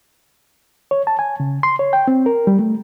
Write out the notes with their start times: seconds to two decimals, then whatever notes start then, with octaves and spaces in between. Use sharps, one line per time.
0.91 C#5
1.07 A5
1.19 G#5
1.40 C#3
1.63 C6
1.79 C#5
1.93 G5
2.08 C4
2.26 A#4
2.47 G3
2.59 A3